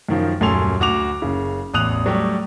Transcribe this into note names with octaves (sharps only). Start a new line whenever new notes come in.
F#2 D#3 F3
D#1 F#2 A4 G#5 C6 F7
D2 F#4 D6 F7
F#1 C#3
A1 E2 D#6 F#6 F7
F#3 G3 A3 G4